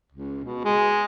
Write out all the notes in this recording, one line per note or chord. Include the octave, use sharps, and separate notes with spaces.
C#2
B2
G#3